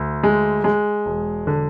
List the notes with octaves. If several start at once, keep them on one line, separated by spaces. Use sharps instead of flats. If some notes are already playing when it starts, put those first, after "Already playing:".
Already playing: D2
G#3
G#3
E1
D3